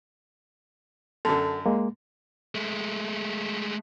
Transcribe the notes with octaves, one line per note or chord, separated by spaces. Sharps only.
F#2 D3 A4
G#3 A#3
G#3 A3